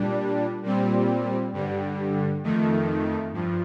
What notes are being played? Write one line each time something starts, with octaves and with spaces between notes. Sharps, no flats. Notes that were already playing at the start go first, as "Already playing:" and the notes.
Already playing: A#2 G3 D4
A#2 G3 C4
G2 D3 G3
F2 D#3 A3
G2 F3